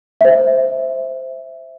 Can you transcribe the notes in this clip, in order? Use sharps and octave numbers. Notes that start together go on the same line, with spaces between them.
C5 E5